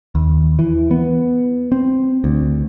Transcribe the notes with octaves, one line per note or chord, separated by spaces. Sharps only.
D#2
E3
B3
C4
D2